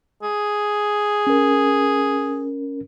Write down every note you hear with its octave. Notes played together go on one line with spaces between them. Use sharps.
G#4
C#4 A#4